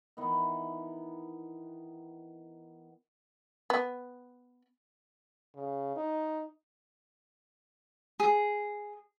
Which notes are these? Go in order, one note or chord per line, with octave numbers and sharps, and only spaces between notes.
D#3 E3 B3
B3
C#3
D#4
G#4